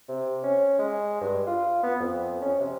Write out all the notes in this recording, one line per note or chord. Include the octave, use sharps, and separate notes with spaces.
C3
C#4
G#3
G2
F4
B3
F2
C#4
C3